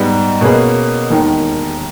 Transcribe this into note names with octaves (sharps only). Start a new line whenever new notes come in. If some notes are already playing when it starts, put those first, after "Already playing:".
Already playing: G#2 G3 B3
B2 A#3 C#4 G#4 B4
E1 D#2 D#3